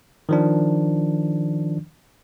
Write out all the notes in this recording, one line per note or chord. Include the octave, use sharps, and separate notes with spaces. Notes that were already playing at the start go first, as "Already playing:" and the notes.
D#3 F3 D4